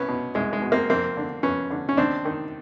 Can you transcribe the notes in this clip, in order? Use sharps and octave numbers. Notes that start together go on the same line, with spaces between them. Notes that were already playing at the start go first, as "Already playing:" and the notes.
Already playing: C2 B3 C#4
B2
C2 G#3
G#3
B2
A#3 C4
F2 A#3 C4
D3
F2 B3 C#4
D3
C#4
D#2 C4 D4
D#3